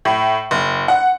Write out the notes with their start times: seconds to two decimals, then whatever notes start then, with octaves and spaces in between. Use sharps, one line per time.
0.05 A2
0.51 F#1
0.88 F#5